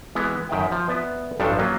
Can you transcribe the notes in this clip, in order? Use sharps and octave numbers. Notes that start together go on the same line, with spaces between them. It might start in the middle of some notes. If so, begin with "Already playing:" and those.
E3 G#3 B3
F#2 D#3 E5 G5
F3
B3 B4 D5 E5
A1 G2 F3 F#3 D4 A4
F#3 A#3 C#4 F4